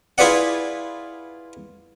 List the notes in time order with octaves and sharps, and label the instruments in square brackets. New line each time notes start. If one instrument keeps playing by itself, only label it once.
[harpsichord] E4 F4 G#4 B4 D5 F#5